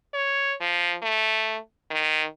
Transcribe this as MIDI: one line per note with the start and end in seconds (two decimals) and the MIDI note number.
0.14 0.54 73
0.60 0.96 53
1.03 1.57 57
1.91 2.25 51